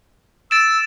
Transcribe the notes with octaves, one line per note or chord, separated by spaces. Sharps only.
E6 A6 D7 E7